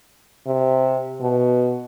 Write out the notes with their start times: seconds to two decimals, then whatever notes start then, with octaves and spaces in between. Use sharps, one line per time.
0.46 C3
1.21 B2